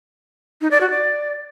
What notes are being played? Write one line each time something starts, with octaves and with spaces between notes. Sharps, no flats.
D#4
D5
F#4
D5